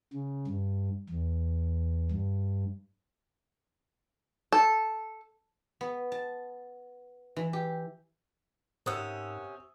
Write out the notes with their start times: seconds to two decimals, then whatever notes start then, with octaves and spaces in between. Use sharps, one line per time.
0.13 C#3
0.48 G2
1.10 E2
2.12 G2
4.52 A4
5.81 B3
6.12 A5
7.36 E3
7.53 G4
8.86 G#2 C3 C#4 A#4 C5 F#5 D#6 E6